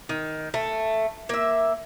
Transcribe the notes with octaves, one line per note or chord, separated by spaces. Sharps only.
D#3
A3
A#3 E5